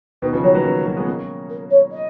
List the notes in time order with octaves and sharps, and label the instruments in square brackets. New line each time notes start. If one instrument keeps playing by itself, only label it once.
[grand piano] B2 D#3 [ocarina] B4
[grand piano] C#3 F3 [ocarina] B4
[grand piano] D#3 F#3 [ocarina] C#5
[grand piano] F#3 A#3 [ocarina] B4
[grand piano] A#3 C#4
F#3 A#3
G#3 B3
A#3 C#4
[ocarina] A#4
C#5
D#5